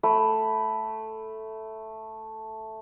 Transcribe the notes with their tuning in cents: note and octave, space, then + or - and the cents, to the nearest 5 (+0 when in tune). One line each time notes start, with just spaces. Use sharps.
A3 +0 B5 +0